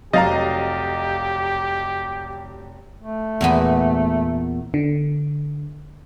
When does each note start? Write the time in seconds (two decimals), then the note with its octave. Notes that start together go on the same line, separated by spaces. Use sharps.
0.13 F1 F#3 G4 D#5 F5 A#5 A6
3.01 A3
3.41 E2 A#2 B3
4.74 D3